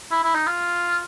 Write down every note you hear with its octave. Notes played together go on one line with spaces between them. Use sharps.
E4
E4
D#4
F4